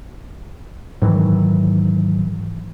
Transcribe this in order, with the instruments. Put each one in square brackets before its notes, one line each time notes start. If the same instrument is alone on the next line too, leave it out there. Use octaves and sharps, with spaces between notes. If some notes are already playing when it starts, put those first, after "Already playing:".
[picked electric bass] G#2 D#3 E3 F#3